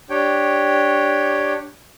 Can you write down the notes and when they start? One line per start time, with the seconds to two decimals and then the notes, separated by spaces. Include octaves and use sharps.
0.10 D4 G4 C#5 G5